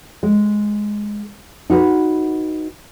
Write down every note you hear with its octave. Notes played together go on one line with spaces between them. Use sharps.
G#3
D#4 F#4 B4